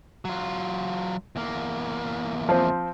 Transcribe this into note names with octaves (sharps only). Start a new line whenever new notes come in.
F#3 F4
E2 A#3
F3 C4